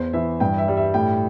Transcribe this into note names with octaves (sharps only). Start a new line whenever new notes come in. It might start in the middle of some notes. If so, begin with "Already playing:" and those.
Already playing: E2 C5
E3 E5
G2 G5
E5
G3
E5
A2 G5